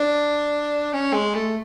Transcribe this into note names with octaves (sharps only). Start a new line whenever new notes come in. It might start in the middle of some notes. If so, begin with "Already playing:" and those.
Already playing: D4
C#4
G#3
A3